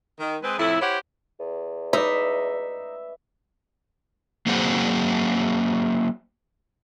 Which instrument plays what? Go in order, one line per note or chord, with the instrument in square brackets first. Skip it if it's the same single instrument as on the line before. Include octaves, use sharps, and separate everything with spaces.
[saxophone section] D#3
G#3 C4 G#4 B4
F2 A2 E4
E4 G4 C5 C#5 F#5
[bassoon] E2
[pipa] D#4 [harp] B4 D5 [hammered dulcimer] E5
[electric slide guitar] F#3 A#3 C4 F#4 G#4 C5